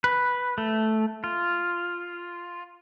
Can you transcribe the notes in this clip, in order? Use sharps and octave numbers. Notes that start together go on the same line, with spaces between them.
B4
A3
F4